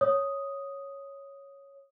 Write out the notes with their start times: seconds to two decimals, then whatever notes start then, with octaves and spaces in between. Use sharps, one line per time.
0.01 C#5 D#6